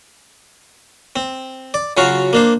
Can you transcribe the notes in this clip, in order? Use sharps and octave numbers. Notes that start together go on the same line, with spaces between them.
C4
D5
C#3 F#3 F4 F#4 F5
A#3 D4 C5